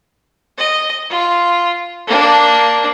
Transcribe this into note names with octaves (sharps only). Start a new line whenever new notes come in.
D#5
F4
A#3 D4